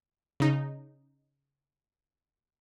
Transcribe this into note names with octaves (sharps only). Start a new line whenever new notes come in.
C#3 D#4